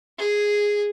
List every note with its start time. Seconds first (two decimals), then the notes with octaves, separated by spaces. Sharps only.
0.19 G#4